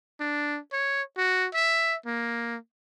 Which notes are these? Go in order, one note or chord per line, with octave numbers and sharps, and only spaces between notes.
D4
C#5
F#4
E5
A#3